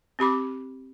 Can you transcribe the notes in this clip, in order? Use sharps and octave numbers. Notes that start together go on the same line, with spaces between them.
C4 G4 B5 D6